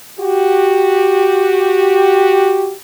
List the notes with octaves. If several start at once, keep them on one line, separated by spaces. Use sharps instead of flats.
F#4 G4